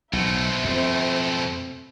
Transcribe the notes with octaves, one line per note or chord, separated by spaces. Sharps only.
B1 B2 A3 C5 E5
F2 C4